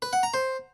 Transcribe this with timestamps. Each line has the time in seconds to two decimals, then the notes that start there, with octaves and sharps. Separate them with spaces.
0.02 B4
0.13 F#5
0.23 A#5
0.34 C5